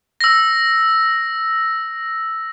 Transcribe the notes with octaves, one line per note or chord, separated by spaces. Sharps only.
E6 A#6